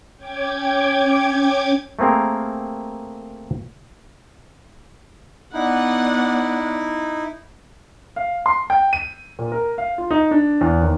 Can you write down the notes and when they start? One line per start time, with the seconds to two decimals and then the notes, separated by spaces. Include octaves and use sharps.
0.16 C#4 G5 D6 G#6
1.99 A3 A#3 C4 G#4 A#4
5.54 B3 D#4 E4 D5 F#5
8.16 F5
8.46 C6
8.70 G5
8.93 D#7
9.39 A#2
9.52 A#4
9.78 F5
9.98 F4
10.11 D#4
10.31 D4
10.61 E2
10.82 D#2